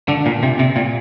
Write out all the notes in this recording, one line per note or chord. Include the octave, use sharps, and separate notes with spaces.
D3
A#2
C3
C3
A#2